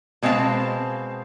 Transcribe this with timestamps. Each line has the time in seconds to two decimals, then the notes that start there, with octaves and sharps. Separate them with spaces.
0.23 B2 G#3 C4 F5 A5